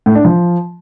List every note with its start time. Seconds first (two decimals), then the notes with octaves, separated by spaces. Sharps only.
0.06 A2
0.15 D4
0.25 F3